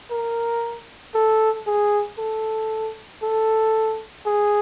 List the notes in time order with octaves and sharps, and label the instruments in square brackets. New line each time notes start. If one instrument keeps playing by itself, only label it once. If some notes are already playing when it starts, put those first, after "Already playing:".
[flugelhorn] A#4
A4
G#4
A4
A4
G#4